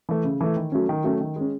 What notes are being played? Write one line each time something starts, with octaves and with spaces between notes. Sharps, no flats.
E3 A3
C#3
E3 A3
D#3
F#3 A3 C#4
D#3
F#3 A3 C#4
D#3
G#3 C#4